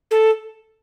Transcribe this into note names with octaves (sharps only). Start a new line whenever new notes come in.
A4